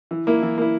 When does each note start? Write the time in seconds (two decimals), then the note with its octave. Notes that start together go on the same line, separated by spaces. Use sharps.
0.11 E3
0.27 A#3 E4
0.43 E3
0.58 A#3 E4